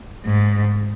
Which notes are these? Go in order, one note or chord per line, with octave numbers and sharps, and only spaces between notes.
G#2